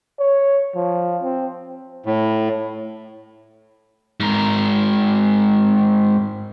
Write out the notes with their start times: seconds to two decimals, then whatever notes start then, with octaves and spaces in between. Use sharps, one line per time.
0.19 C#5
0.76 F3
1.23 C4
2.06 A2
4.20 G#2 A#4